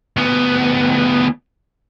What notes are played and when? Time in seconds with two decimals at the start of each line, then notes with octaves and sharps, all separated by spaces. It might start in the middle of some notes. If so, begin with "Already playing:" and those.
0.17 D2 B3